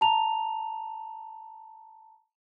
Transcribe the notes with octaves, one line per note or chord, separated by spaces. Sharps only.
A5 A#5 F7